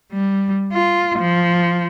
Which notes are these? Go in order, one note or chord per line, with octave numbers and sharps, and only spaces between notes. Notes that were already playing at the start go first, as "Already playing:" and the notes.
G3
F4
F3